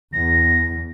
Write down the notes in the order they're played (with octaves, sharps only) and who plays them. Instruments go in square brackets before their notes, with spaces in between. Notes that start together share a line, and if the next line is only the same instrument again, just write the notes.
[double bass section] E2 [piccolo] A#6